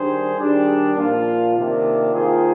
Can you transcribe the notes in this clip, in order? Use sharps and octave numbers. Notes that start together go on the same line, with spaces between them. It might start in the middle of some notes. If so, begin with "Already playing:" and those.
Already playing: D#3 G3 D4 G#4 C5
D#3 G3 D4 G#4
A#2 F3 A#3 F4
C3 D#3 A#3 D4 F4
D#3 A#3 F4 G#4 C5